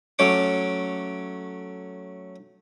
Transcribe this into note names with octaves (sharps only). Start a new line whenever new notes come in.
F#3 A3 C#4 D6